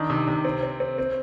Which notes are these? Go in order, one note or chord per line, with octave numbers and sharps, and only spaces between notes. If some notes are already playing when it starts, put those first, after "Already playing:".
Already playing: D#3 D4
C3
C3
C4
C4
C4
C4